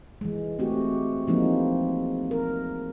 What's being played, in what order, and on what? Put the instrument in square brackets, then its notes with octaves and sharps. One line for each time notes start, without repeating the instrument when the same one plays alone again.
[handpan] E3 G#3
A3 C4 F#4 G4
E3 F3 G#3 A#3 C4 D#4
A#4